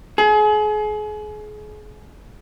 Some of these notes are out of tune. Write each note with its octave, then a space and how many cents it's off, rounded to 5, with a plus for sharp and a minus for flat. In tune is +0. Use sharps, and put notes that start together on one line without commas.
G#4 +35